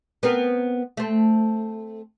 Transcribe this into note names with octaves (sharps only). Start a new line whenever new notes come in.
B3 C4 A#4
A3 C4